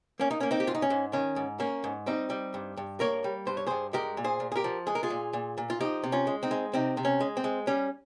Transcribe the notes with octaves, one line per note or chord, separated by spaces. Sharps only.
A#3 C#4
D#4
A#3 C#4
C4 D#4
G4
G#2 F4
D#4
C#4
G#2
D#3 C#4
G#2
A#3 C#4
G#2
G3 C4 D#4
G3
G2
G2
A#3 A#4 C#5
G3
G2 C5
C#5
G2 G#4 C5
G#3 G4 A#4
A#2
G#4 C5
A#2
G#4
G4 A#4
F3
G#3 G#4
A#4
F4 G#4
A#2
A#2
A#2
F4
F3 D#4 G4
C3
C#4 F4
G#3
C4 D#4
G#3
C3 C4 D#4
C3
C#4
G#3
C4
G#3
G3 C#4